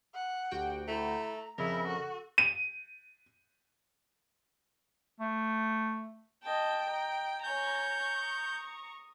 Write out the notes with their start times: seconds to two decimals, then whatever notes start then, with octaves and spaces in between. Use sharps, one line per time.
0.14 F#5
0.51 D2 F#4 G4 G5
0.88 A3 E4 A#5
1.58 F2 C#3 E4 G#4 A#4
1.88 F#4 A4
2.38 D#7
5.20 A3
6.44 D#5 G5 A5
6.89 D#5 A#5
7.44 C#5 G#5 A#5 C#6 G6
8.17 D#6